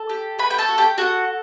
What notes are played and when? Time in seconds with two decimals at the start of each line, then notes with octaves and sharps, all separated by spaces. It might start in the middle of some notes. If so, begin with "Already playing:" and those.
Already playing: A4
0.10 G4
0.39 A3 B4 B5
0.50 G5
0.58 A4 A5
0.68 F#4
0.78 G4 G5
0.98 F#4 A4 F#5